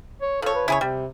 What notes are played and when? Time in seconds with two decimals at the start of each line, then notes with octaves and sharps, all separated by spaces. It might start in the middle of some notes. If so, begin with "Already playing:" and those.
0.21 C#5
0.42 F3 A4 C#5
0.55 B4
0.68 C#3 E4 G#4 C#5
0.81 C3 G3